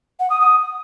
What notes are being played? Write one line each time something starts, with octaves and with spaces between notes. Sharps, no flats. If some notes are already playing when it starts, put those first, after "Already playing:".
F#5
D#6
D#6